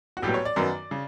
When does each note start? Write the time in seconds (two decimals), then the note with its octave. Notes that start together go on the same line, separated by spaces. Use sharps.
0.17 F#4
0.22 A#1 A2 F#3 B3 G4
0.34 C#5
0.45 D5
0.56 F#2 D#3 F#3 B3
0.91 C#3